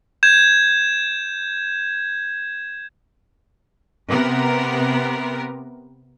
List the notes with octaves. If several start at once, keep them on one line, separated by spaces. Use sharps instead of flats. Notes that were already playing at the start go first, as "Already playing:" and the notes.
G6 G#6 E7
C3 B3 A#4